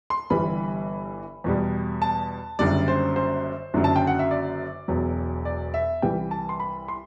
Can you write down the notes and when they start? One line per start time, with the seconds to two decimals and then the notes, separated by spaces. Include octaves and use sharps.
0.10 C6
0.30 G1 G2 E3 G3 B5
1.44 E2 B2 G3
2.02 A5
2.59 F#1 F#2 D3 G3 D5
2.88 C5
3.16 C5
3.74 F#1 F#2 D3 F#3
3.84 A5
3.96 G5
4.07 F#5
4.19 E5
4.31 D5
4.88 E1 E2 B2 F#3
5.45 D5
5.74 E5
6.02 C2 C3 E3 G3 G5
6.31 A5
6.49 C6
6.60 B5
6.88 C6